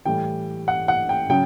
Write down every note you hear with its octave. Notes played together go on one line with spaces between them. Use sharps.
A2 E3 G3 G5
F#5
F#5
G5
C#3 F#3 G5